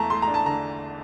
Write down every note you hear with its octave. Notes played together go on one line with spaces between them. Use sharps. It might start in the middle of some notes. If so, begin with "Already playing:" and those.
Already playing: E2 E3 A3 A5 A#5
A3 C6
A#5
D4
A5
D3 A#5